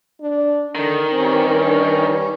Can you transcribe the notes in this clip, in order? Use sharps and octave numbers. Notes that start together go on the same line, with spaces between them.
D4
D3 D#3
G2 C4 C#4
D4